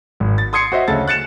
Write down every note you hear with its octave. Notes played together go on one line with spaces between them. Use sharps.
G#1
A6
C6 D#6 G#6 C7 C#7
F#4 C5 D#5 E5
D2 C#3 A4 A6
F#6 A6 C#7 E7